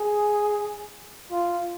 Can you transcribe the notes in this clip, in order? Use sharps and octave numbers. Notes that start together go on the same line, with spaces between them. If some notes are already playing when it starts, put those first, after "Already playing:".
Already playing: G#4
F4